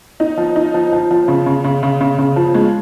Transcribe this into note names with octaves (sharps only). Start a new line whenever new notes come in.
D#4
F3
D#4
F3
F3
F3
C#3
C#3
C#3
C#3
C#3
C#3
F3
G#3